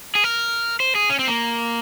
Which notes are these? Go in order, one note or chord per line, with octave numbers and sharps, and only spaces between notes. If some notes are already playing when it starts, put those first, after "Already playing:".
G#4
A#4
C5
G#4
C#4
C4
A#3